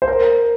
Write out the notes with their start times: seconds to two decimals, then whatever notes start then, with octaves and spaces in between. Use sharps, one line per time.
0.02 C5
0.08 A#4